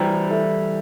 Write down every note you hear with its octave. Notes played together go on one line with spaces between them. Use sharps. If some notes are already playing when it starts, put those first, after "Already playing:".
Already playing: E3 G3 C5 G5 A#5
E4 A4 E5